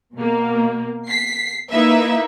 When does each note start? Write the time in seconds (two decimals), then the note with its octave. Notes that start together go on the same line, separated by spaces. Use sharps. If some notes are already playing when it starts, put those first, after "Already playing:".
0.15 B2 A#3
1.09 B6 C7
1.71 A#3 D#4 E4 B4 E5